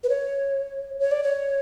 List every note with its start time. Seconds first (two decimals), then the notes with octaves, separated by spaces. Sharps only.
0.04 B4
0.09 C#5
1.00 C#5
1.11 D5
1.24 C#5